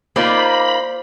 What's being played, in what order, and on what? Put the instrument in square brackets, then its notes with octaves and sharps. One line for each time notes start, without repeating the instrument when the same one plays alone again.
[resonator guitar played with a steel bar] A#3 D#4 F4 [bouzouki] C5 D5 [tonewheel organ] B5